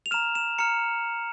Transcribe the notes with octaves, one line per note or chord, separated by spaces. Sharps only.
F7
A#5 F6 E7
E7
A#5 F6 C#7